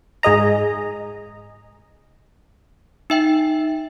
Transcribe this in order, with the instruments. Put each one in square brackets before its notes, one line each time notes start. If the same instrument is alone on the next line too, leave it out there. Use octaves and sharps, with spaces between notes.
[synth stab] G#2 G#4 D#5 A#5
[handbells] D#4 E5 G5